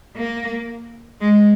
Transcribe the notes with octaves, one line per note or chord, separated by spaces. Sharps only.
A#3
G#3